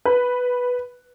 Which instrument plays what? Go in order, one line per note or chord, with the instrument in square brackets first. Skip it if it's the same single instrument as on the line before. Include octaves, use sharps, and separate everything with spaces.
[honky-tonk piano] B4